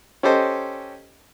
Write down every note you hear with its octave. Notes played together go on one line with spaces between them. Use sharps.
C#4 G4 A4 C5 D#5